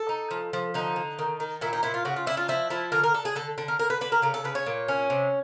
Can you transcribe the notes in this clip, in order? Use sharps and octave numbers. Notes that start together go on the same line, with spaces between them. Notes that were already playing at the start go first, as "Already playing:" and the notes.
Already playing: A4
D#4
F3
F3
D3 D#4
D3
D#3
D#3
A#2 E4
D#4
A#2 E4
F4
C#3 F#4
F4
D4 E4
F4
F3 E4
F3 E4
D3 A#4
A#4
D4 A4
G#4
D3 A4
D3
A#4
D3 A#4
B4
D4 B4
A#4
C#3 A#4
A4
C#3 B4
C#5
A#2
C#4
C3